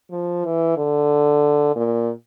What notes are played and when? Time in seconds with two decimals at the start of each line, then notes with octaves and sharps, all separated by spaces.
0.11 F3
0.45 E3
0.77 D3
1.76 A#2